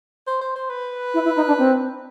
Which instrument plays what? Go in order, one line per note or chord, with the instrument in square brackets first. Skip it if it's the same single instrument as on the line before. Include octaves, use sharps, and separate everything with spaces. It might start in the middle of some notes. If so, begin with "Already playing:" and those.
[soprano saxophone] C5
C5
C5
B4
[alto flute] E4
E4
D#4
D4
C4